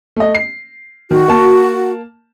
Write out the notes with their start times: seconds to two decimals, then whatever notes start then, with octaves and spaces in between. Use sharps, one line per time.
0.16 A3 D#5
0.35 C7
1.11 D#3 F#4
1.28 A#3 A5